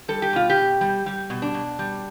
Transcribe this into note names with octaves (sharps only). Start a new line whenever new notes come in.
G3 A4
G4
B2 F4
G4
B2
G3
G3
B2
D4
B2
G3